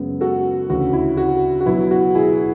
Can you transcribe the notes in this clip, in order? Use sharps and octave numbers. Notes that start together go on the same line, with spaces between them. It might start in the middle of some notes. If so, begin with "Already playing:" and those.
Already playing: F#2 C#3 G#3 B3
F#4 A4
D2 C#3 E3 F#4
E4
F#4
F#4
B2 F#3 B3 E4
F#4
E4 G#4